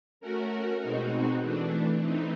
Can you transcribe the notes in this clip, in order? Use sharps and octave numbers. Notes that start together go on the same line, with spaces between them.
A3 C#4 F#4 A#4
B2 G#3 C4 D#4 F#4
E3 A3 D4
E3 A3 C4 D#4